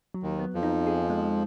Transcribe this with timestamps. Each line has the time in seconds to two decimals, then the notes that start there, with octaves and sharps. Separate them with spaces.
0.14 F#3
0.23 D#2 D#3
0.39 B3
0.54 F2 F3
0.63 D#4
0.87 G#4
1.10 G#3